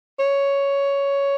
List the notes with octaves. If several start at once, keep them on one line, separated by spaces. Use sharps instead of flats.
C#5